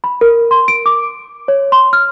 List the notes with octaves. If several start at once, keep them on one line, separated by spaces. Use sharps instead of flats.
B5
A#4
C6
D7
D6
C#5
C6
F6